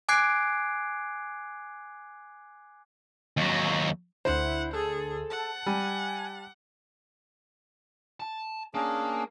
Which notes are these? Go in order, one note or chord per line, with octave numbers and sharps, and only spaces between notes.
G#5 D6 F#6 G#6 C7 D7
D#2 F#3
D2 D3 E4 C5 F#5
G#4 A4
F#5 A5
G3 G#5
A5
A#3 C#4 D4 G#4